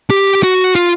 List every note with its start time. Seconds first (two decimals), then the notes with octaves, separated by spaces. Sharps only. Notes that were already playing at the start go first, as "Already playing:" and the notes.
0.10 G4
0.43 F#4
0.75 F4